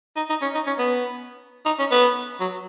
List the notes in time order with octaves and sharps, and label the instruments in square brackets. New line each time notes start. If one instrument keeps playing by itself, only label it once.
[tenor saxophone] D#4
D#4
C#4
D#4
C#4
B3
D#4
C#4
B3
F#3